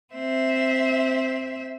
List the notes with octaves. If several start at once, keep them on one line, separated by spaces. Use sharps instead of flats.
C4 E5